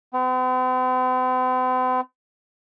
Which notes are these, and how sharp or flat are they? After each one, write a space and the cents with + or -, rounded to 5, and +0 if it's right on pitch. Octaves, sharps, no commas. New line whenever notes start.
C4 -45